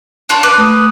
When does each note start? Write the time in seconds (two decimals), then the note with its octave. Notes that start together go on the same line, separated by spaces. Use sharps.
0.29 D4 F4 C#5
0.43 B4 D6
0.58 A3 D#6